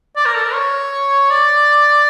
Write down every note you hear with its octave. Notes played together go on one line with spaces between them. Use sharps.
D5
A#4
A4
A#4
C#5
D5